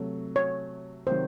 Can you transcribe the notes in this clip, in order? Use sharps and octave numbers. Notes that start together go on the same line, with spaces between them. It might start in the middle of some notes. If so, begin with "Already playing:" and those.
Already playing: C3 F#3 A3
C#5
C3 D#3 F#3 C5